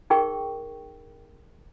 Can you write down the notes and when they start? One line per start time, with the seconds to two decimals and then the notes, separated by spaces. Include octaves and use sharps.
0.10 D#4 G#4 A#4 G5 C#6